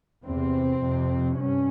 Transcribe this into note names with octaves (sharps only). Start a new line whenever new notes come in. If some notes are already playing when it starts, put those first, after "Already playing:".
E2 C3 C4
F2 C3
G2 C#4